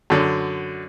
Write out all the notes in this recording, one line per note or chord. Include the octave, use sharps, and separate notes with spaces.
F#2 D3